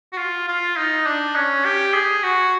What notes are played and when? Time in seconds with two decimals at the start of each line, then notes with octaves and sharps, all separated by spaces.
0.12 F#4
0.17 F4
0.48 F4
0.77 D#4
1.06 D4
1.35 C#4
1.65 G4
1.94 G#4
2.23 F#4